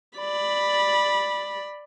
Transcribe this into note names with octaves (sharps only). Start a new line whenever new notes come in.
D5 B5